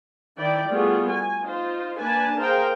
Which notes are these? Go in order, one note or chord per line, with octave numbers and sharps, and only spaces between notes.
D#3 E4 D5 G5
G3 A3 B3 F4 F#4 G#4
G#5
D#4 F4 C5
A#3 D4 B4 G#5 A5
G#4 A#4 C5 F5 G5